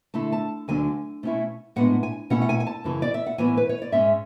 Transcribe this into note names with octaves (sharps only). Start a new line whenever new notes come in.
D3 A3 E4 A5
A5
D2 D3 F#3 A3 D4 G#5
B2 A3 C#4 E4
A2 G#3 B3 D4 F#5
G#5
B2 A3 C#4 E4 F#5
F#5
G#5
G#5
A5
F#2 C#3 E3
D5
E5
F#5
A2 E3 B3 E4 G#5
B4
C#5
D5
G#2 G#3 C#4 E5